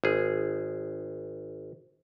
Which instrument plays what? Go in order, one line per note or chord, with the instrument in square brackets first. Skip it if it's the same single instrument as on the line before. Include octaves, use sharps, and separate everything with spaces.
[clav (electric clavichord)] G#1 G#4